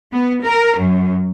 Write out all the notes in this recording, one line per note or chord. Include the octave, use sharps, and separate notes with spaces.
B3
A#4
F#2